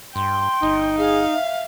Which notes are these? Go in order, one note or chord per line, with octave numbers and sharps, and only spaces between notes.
G2 G5 C6
G1 D#4
G#4 F5
E5